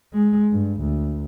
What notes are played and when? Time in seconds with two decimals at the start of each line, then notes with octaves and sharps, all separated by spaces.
0.14 G#3
0.52 G2
0.81 D2